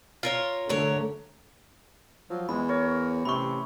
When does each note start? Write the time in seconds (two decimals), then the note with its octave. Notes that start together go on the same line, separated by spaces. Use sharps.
0.23 F4 A#4 C#5
0.69 D3 F#3 A3 A#4 C#5
2.30 F3 F#3
2.49 E2 G#3 B5
2.69 A#4 C#5
3.25 A1 C3 B5 C#6